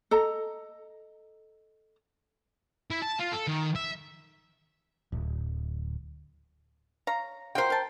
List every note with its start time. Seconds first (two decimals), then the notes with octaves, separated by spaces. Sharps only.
0.11 A4 D#5 A#5
2.91 E4
3.02 A5
3.20 F4
3.32 A4
3.48 D#3
3.75 E5
5.12 D1
7.07 C#5 F5 A#5
7.55 F4 F#4 A#4 C5 G5
7.70 A#4 A5